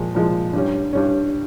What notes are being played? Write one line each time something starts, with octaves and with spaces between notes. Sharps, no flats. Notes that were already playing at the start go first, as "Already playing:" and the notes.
Already playing: A#2 F3 G#3
A#2 F3 G#3
G2 G3 C#4
G2 G3 C#4